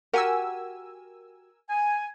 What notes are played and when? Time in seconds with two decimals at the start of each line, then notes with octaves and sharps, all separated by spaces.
0.13 F#4 G4 A#4 F#5 G#5 E6
1.69 G#5